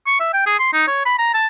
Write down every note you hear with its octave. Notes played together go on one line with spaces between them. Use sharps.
C#6
E5
G5
G#4
C6
D#4
C#5
B5
A#5
A5